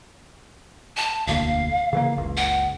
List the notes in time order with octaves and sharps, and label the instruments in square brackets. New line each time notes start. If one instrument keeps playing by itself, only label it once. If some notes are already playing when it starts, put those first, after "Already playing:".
[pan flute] A5
[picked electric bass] E1 D2 A#3 [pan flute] F5
[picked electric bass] C#3 E3 A#3
F#1 C#2
[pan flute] F#5